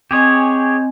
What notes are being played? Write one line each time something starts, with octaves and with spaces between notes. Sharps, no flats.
C4 G4 G#4 C#5 D#5 G#5